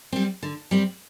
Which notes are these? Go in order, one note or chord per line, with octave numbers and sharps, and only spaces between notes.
G3 C4
D3
G3 C4